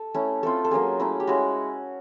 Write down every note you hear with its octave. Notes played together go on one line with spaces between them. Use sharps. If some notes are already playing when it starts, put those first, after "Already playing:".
Already playing: A4
A3 C#4 E4
A3 C4 F4 A4
A4
F#3 A#3 C#4 F4 G#4
A3 C#4 E4
G4
G#3 C#4 E4 F#4